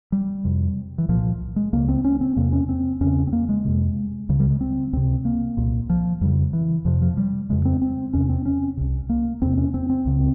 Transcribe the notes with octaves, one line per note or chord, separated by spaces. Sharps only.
G3
F2 C3
E3
C2 A#2 F3
G#3
C#2 C#3 A#3
C4
C#4
C4
E2 C3 A#3
C#4
C4
E2 C#3 C#4
C4
A#3
G#3
F2 C3
C#2 C#3 G3
G3
G#3
C4
C#2 C3 C4
A#3
C2 A#2
F3
F2 C#3 G3
E3
F2 C3 F3
F3
G3
F2 C#3 G#3
C4
C4
E2 C3 C#4
C4
C#4
C2 C3
A#3
E2 C3 C4
C#4
C4
C4
C#2 C#3